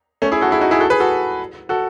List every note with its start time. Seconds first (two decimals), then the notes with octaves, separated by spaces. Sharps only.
0.22 A3 C#4
0.32 E4 G#4
0.41 F#4 A4
0.51 E4 G#4
0.61 D#4 F#4
0.71 E4 G#4
0.80 F#4 A4
0.90 G#4 B4
1.00 F#4 A4
1.69 F#4 A4